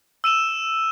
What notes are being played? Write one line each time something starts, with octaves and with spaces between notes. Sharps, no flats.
E6 D#7 E7 G7